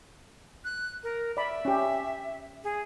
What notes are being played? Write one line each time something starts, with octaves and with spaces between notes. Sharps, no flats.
F#6
A#4
D5 E5 B5
C#4 G4
G#4